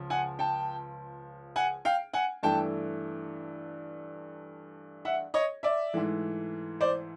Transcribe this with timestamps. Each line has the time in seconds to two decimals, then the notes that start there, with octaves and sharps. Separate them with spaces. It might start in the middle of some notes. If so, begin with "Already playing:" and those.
Already playing: C#2 C#3 F3
0.10 F#5 G#5
0.39 G5 A5
1.56 F#5 G#5
1.85 F5 G5
2.14 F#5 G#5
2.43 G2 E3 A3 G5 A5
5.05 E5 F#5
5.34 C#5 D#5
5.63 D5 E5
5.93 G#2 E3 A3
6.81 C5 D5